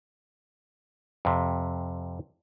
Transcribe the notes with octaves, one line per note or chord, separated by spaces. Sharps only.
F2 C3